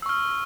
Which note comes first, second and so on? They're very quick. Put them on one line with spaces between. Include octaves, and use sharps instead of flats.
E6 C#6 F6